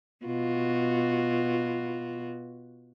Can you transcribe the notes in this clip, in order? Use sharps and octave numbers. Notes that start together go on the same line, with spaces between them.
B2 F4 F#4